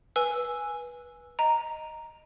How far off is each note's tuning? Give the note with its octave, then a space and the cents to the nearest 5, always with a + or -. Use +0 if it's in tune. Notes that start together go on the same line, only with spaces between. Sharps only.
B4 -20 G#5 +0 E6 +0
D#5 +0 A#5 +0